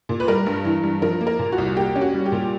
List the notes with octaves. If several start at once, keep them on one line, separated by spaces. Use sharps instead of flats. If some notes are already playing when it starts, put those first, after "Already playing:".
A#2
B4
G3 A#4
G2
E3
G2
F3 A#4
A#3
A#4
A#2
F#4
C2
A#3 G4
C#4
F#4
G3
G4
A#2